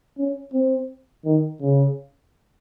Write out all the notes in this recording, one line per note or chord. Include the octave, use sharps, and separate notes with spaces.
C#4
C4
D#3
C#3